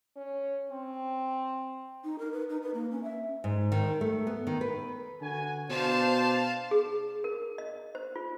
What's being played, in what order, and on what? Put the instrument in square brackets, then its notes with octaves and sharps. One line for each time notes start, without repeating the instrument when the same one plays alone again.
[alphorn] C#4
C4
[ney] D#4
A#4
B4
D#4
B4
A#3
C#4
E5
[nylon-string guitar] G#2
D#3
A3
B3
D#3
B4
[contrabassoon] D3 [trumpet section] F#4 G#5
[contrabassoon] B2 [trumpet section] D4 C5 [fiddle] F5 A5
[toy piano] G#4
A#4
D#5
C5
F4